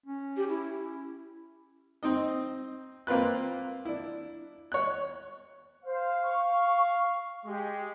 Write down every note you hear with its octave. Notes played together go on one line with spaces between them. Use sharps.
C#4
G4
E4
C4 D#4 D#5
A#3 C4 F4 B4 F#6
D4 E4
C#5 F#6
C5 F5
C#6
G#3 G4